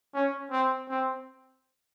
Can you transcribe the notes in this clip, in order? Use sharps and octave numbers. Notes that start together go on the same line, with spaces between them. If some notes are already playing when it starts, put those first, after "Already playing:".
C#4
C4
C4